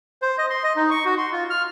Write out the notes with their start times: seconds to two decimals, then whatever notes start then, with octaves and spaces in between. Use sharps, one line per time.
0.22 C5
0.38 D#5
0.50 C6
0.64 D#5
0.76 D#4
0.91 C#6
1.05 F#4
1.18 C6
1.32 F4
1.50 F6